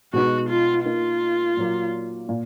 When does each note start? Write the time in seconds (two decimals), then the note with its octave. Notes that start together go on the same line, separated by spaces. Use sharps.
0.13 B2 G#3 B3 D#4 F#4
0.49 F4
0.85 A#3 D#4 F4 A#4
1.57 A#2 F#3 A#3
2.29 A#2